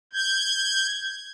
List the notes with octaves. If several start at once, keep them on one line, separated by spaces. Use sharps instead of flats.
G6 G#6